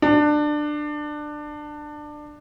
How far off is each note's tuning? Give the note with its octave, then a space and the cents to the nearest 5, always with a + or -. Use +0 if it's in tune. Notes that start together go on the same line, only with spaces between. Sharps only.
D4 +20